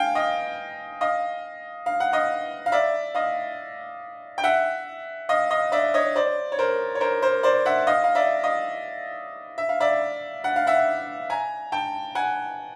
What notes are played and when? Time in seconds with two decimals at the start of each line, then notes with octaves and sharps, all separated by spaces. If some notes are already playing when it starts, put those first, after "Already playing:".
Already playing: F5 G5 G#5
0.15 D#5 F5
1.01 D#5 F5
1.86 F5
2.00 F#5
2.13 D#5 F5
2.66 F5
2.72 D5 E5
3.15 D#5 F5
4.38 G5
4.44 E5 F#5
5.29 D#5 F5
5.51 D#5 F5
5.72 D5 E5
5.94 C#5 D#5
6.15 C5 D5
6.52 C#5
6.59 A#4 C5
6.95 C#5
7.00 A#4 C5
7.22 A#4 C5
7.43 C5 D5
7.66 E5 F#5
7.87 D#5 F5
8.04 F5
8.15 D5 E5
8.43 D#5 F5
9.58 E5
9.69 F5
9.80 D5 E5
10.44 F#5
10.56 F5
10.67 E5 F#5
11.30 G#5 A#5
11.72 G5 A5
12.15 F#5 G#5